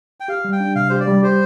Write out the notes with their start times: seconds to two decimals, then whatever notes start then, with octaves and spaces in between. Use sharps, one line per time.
0.20 G5
0.28 G4 F5
0.44 G3
0.52 G5
0.60 D4
0.75 C3 F5
0.90 G4 C5
1.00 D5
1.08 G3
1.23 G4 C5